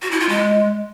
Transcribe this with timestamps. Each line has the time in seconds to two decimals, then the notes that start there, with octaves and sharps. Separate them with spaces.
0.02 F#4
0.11 E4
0.20 F4
0.29 G#3